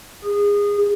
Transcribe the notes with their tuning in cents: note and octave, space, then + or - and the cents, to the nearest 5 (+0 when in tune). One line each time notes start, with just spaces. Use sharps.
G#4 -25